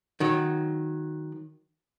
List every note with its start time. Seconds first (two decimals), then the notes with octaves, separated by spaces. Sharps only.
0.20 D#3 F#3